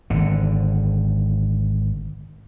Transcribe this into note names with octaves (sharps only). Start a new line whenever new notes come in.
G#1 D3